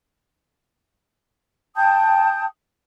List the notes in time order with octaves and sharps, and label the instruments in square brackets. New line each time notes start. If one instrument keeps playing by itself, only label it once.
[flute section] G5 A5 D#6 G6